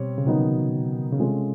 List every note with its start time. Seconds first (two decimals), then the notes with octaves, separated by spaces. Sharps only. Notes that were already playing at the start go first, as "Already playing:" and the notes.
Already playing: B2 G3 C4 C#5
0.18 C#3
0.26 C3 D#3 F#3 B3 D#4 F#4
1.13 C#3
1.19 C3 G#3 C#4 F4 A4